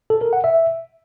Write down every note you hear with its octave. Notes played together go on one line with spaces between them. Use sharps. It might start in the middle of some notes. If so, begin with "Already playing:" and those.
A4
A#4
F#5
E5